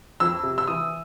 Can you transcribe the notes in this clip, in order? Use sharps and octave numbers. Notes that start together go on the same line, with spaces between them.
F2 E6
C3
E6
E3 D#6